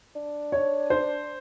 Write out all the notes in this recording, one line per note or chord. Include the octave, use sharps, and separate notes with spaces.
D4
C#5
C5